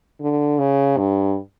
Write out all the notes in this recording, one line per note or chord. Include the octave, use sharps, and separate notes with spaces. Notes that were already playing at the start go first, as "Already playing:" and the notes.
D3
C#3
G2